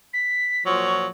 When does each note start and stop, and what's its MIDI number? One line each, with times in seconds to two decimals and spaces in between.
0.13 0.63 95
0.66 1.07 46
0.66 1.07 53
0.66 1.07 54
0.66 0.94 85